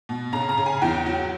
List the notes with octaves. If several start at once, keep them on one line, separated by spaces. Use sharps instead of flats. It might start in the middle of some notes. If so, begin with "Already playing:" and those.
B2
C#3 A#5
A#5
C#3
G#5
E2 G5
F#3